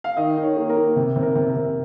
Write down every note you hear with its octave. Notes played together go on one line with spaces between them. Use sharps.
F5
D#3 D#5
D#3
C#5
A#3
A#4
A#3
C3
C3
A#4
C3
A#4
C3